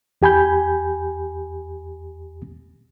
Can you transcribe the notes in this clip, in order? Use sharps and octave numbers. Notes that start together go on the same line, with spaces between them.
E2 G4 G#5 B5 G6